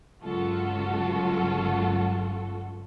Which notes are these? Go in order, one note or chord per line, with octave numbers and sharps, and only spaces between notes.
G1 C#2 F#3 F4 F#4 A4